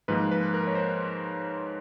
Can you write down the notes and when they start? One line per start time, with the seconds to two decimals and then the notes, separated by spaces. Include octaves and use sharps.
0.08 G#2 F3 A#3 B4
0.31 B4
0.54 A#4
0.67 C#5
0.75 C5